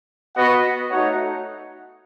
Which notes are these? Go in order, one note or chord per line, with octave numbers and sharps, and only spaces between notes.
B3 F#4 B4 D#5 F#5
A3 D#4 F#4 C#5 F#5